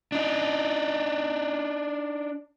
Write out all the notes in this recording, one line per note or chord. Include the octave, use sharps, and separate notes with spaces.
D4 D#4